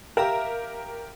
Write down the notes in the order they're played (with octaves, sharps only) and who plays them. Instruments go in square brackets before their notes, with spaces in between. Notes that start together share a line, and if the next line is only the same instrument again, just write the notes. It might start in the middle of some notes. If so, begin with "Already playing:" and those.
[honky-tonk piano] G4 A#4 [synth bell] E5 F5 A#5